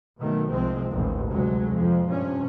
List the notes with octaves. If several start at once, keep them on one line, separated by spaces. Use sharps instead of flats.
B2 D#3 F#3 A3
C2 F3 G#3 C4
A1 D#2
D2 C3 F#3 G#3
F2 F3
G2 C3 C#4